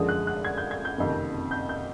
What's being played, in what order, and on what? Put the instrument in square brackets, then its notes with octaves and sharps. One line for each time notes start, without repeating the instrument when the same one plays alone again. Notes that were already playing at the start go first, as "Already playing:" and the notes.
Already playing: [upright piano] F#2 D3 F3 G#3 D#6
F#6
F#6
G#6
G6
G#6
G6
F#1 F2 C3 D#3
G6
G6